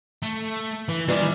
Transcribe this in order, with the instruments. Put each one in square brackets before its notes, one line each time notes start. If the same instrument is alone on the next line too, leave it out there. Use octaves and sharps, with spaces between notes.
[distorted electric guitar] A3
E3
[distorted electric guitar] D#3 [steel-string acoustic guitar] E3 G3 E4